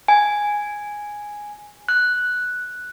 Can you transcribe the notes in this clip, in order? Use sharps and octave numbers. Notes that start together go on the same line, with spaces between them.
G#5
F#6